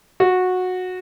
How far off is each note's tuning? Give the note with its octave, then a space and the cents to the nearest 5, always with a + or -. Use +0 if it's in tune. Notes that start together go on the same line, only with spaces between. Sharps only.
F#4 -15